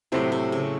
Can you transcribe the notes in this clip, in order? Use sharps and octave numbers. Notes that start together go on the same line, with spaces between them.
A2 C3 F#3 A3 C4 E4
C3
C#3